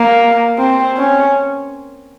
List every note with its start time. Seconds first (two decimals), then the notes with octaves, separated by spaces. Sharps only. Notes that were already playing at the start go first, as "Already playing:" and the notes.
Already playing: A#3
0.59 C4
0.97 C#4